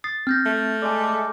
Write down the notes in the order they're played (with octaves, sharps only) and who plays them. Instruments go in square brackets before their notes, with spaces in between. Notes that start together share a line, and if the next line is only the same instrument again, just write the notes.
[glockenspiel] D#6 A6 C7
[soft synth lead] C4 [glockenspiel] F6 G6 A#6
[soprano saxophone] A3
[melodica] G#3 A4 [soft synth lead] D5 [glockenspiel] G#5 D6
[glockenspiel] D6